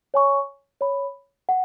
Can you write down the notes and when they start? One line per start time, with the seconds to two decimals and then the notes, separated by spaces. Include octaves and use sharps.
0.14 C#5 G#5 C#6
0.81 C#5 B5
1.49 F#5